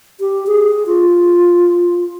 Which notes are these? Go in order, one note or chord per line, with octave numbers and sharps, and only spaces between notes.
G4
G#4
F4